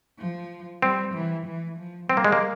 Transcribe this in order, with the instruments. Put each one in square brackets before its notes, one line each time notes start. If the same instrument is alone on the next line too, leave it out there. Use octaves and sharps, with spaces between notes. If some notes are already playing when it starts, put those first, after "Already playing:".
[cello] F3
[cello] G3 [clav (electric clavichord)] C4
[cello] E3
E3
F3
[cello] G3 [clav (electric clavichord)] C4
[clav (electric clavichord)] A#3
G#3
A#3